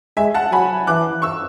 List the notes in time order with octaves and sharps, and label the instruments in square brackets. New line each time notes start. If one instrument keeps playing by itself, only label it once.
[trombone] G#3 [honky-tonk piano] E5 G#5
[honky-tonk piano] F#5 A5
[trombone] F#3 [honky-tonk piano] G#5 B5
[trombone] E3 [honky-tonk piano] D6 F#6
[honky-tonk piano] C#6 E6